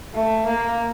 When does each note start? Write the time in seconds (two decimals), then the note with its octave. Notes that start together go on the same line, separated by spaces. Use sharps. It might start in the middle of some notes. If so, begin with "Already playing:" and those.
0.14 A3
0.46 A#3